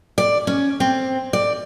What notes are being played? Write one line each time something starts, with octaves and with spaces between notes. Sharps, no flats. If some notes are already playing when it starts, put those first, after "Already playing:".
D5
C#4
C4
D5